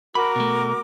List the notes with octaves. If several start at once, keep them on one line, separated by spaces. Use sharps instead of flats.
F#4 A#4 B5 D6
B2 A3